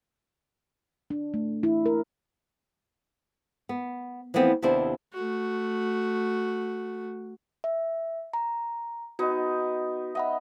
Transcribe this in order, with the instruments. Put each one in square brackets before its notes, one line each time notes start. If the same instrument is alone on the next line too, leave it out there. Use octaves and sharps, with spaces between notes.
[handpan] D4
A3
E4
A#4
[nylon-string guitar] B3
E3 F3 A3 B3 C4
D#2 C3 B3 D4 E4 C5
[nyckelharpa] A3 F#4
[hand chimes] E5
A#5
[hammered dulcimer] B3 D#4 [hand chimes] F#4
[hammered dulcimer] D#5 [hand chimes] E5 F#5 B5